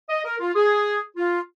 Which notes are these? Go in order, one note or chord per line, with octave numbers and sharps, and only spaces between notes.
D#5
A#4
F4
G#4
F4